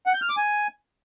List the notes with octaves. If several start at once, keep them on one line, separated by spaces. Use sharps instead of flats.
F#5
G6
F6
D6
G#5